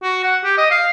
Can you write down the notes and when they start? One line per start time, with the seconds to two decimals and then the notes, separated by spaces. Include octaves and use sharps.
0.02 F#4
0.23 F#5
0.44 G4
0.58 D#5
0.71 F5